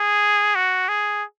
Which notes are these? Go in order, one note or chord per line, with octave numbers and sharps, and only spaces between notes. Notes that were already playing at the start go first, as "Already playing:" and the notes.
Already playing: G#4
F#4
G#4